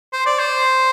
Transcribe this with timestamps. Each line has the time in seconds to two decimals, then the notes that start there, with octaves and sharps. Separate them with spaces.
0.13 C5
0.26 D5
0.39 C5